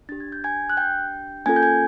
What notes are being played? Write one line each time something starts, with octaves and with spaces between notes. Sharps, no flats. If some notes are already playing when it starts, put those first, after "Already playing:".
D4 G4 A6
G#6
G6
G#5 G#6
F#6
G5 G6
A#3 C#4 F4 A4 G#5 G#6
G6
G#5 G#6